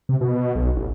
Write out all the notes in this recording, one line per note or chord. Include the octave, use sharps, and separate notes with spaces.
C3
B2
B1
A1